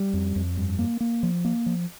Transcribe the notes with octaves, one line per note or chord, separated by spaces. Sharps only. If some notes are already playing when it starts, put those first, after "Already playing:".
Already playing: G3
F2
F2
G2
A#3
A#3
F3
A#3
F3